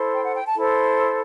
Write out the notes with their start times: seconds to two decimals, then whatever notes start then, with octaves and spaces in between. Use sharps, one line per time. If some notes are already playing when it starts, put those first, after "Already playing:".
Already playing: E4 A4 C5
0.13 G5
0.24 F#5
0.33 G5
0.44 A5
0.55 E4 A4 C5